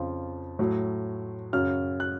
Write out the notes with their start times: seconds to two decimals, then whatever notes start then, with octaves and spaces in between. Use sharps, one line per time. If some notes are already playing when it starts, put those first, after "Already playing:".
Already playing: F2 C#3 F3
0.59 A2 F#3
1.53 F#2 C#3 F#3 F6
2.00 F#6